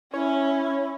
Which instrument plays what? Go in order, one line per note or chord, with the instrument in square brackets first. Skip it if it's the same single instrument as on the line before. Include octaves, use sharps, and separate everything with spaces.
[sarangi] C#4 [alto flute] E4 [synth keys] C#5